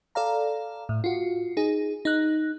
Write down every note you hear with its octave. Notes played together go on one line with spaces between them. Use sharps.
A4 D5 F5 A#5
A2
F4 F#4
D#4 G#4
D#4 F#6